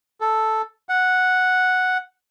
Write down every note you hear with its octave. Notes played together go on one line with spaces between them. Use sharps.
A4
F#5